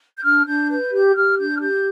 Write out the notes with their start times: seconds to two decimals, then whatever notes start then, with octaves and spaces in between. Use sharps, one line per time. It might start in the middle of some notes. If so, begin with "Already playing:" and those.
0.16 G6
0.23 D4 F6
0.46 D4 G6
0.69 B4 G6
0.92 G4 G6
1.15 G4 F6
1.37 D4 G6
1.56 F6
1.60 G4 G6